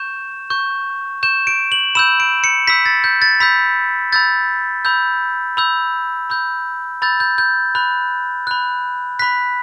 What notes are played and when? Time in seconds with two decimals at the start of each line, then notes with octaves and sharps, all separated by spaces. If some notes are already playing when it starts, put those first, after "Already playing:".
Already playing: C#6 G6 E7
0.50 C#6 G6
1.23 C#6 G6 E7
1.47 D7
1.72 F#7
1.95 B5 E6 G6 E7
2.20 D7
2.44 C#7
2.67 B5 E6 G6 B6
2.86 A6
3.04 G6
3.22 A6
3.40 B5 E6 G6 B6
4.12 B5 E6 G6 A6
4.85 B5 E6 G6
5.57 B5 E6 G6
6.30 B5 E6 G6
7.02 B5 E6 G6 A6
7.20 G6
7.38 G6
7.75 B5 F#6
8.47 B5 F#6
9.19 B5 F#6 B6